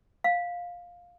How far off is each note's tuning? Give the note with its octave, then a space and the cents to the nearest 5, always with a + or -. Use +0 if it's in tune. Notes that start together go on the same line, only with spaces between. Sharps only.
F5 +10